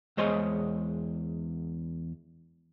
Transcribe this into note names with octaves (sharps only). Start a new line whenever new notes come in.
E2 G#3 C5 C#5 D#5